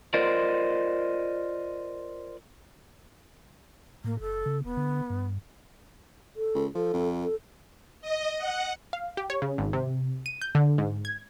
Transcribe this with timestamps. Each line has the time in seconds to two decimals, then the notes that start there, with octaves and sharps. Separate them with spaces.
0.14 F4 A#4 C5 D5 D#5
4.04 A2 A#3
4.20 F#1 A4
4.46 C#3
4.64 E1 B3
4.77 D3
5.10 G2
6.36 A4
6.55 C#2
6.75 F3 A4
6.93 F2
7.24 A4
8.01 D#5
8.38 F#5
8.93 F5
9.17 G4
9.30 C#5
9.42 C#3
9.58 G#1
9.73 C3
10.26 D#7
10.42 G6
10.55 D3
10.78 G#2
11.05 G#6